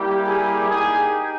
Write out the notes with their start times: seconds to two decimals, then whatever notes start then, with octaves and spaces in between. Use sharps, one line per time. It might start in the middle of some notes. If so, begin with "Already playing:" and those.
Already playing: G3 A#3 E4 G4
0.27 G#4
0.68 A#3 D#4 G4 G#4